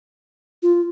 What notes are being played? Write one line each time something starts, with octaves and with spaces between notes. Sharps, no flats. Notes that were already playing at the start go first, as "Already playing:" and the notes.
F4